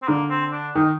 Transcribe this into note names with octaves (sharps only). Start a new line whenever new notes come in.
C4
D3 A#3
C4
D4
D#3 D#4